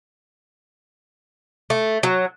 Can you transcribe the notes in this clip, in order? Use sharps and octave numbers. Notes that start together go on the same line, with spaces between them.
A3
F#3